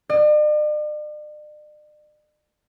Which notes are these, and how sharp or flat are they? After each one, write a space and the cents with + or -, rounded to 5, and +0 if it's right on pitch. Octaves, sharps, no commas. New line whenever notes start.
D5 +45